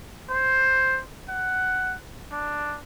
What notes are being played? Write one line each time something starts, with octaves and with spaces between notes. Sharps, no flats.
C5
F#5
D4